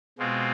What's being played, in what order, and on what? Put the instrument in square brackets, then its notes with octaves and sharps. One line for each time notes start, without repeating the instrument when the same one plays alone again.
[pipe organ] B2 G#3 C4 F4